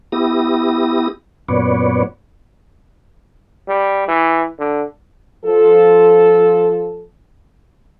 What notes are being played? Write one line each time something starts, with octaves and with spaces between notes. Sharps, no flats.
B3 E4 G4 D#6 A#6
F#2 A#2 B3 B4 C#5 D5
G3
E3
D3
F3 A4